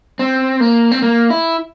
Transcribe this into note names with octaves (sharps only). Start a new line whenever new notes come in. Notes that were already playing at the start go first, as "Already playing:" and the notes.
C4
A#3
C4
A#3
E4